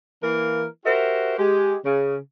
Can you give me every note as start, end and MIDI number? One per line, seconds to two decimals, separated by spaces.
0.23 0.66 52
0.23 0.66 58
0.23 0.66 70
0.85 1.35 66
0.85 1.35 67
0.85 1.35 70
0.85 1.35 72
0.85 1.35 76
0.85 1.35 78
1.39 1.76 56
1.39 1.76 67
1.85 2.16 49